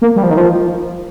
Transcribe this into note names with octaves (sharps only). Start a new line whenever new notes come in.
A#3
G3
F3
D#3
F3